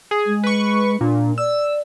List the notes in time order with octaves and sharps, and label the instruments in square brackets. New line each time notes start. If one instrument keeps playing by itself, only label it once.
[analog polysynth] G#4
[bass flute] G#3
[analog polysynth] B4 C#6
[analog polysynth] A#2 [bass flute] D4
[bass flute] D5 [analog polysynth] E6